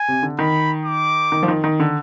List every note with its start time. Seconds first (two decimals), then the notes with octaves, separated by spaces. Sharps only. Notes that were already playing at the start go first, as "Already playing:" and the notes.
Already playing: G#5
0.08 C3
0.23 D3
0.39 D#3 B5
0.86 D6
1.32 D#3
1.43 F3
1.48 D#3
1.64 D#3
1.80 D3